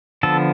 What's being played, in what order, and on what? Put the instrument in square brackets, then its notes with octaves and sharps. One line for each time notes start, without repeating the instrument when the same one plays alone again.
[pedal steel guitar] D3 F3 B3 A4